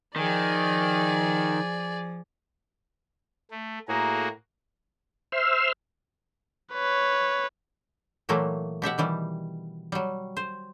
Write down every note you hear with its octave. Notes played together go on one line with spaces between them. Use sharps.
D#3 F3 G#4 D5
A3
A2 A#3 F#4 G#4 A#5
C5 E5 C6 E6 F6
B4 C#5
A#2 E3 F#3 A3 A#3
B2 G4 E5 F#5
D#3 E3 G3
F#3 G3
C5